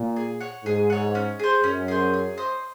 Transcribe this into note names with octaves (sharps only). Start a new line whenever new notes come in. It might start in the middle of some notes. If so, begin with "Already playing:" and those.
Already playing: A#2
G#4
C#5 F#5
G#2 G#4
C#5 F#5
C#4
G#4 C5
F#2 C#4
G#4 C5
G#4
C5 D#5